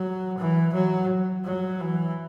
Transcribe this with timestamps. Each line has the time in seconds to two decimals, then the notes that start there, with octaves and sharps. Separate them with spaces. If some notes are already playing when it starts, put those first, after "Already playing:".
Already playing: F#3
0.38 E3
0.74 F#3
1.45 F#3
1.80 E3